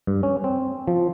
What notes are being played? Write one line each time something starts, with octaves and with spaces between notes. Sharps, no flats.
G2
C#4
C4
F3